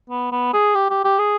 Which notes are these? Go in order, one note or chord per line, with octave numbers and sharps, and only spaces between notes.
B3
B3
G#4
G4
G4
G4
G#4